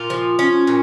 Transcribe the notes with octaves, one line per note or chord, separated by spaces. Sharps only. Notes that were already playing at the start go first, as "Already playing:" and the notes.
Already playing: A#2 F4
F3
C#4
A#2